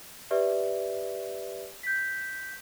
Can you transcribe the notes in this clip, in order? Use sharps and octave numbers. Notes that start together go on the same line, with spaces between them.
G4 B4 D5 E5
G6 B6